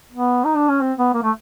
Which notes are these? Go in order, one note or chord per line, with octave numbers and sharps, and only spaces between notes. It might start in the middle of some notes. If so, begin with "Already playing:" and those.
B3
D#4
D4
C#4
C4
B3
A#3
A3